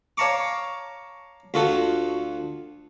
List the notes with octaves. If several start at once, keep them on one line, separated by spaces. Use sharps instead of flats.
C#5 F5 A5 A#5 C#6 D6
D2 F4 F#4 A4